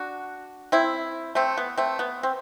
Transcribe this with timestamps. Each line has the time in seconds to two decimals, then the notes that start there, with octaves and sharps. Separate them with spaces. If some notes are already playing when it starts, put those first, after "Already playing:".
Already playing: D4 F#4
0.72 C4 E4
1.35 A3 C4
1.57 B3
1.78 A3 C4
1.99 B3
2.23 C4